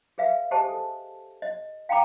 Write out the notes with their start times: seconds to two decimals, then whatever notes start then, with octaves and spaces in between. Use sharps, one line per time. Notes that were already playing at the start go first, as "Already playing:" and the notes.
0.18 G#4 B4 E5 F5
0.51 G4 G#4 C5 D#5 G#5 A5
0.68 A4
1.42 D#5
1.89 F5 G5 G#5 A#5 B5 D6